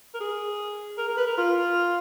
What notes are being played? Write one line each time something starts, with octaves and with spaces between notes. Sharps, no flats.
A#4
G#4
A#4
A#4
B4
A#4
F4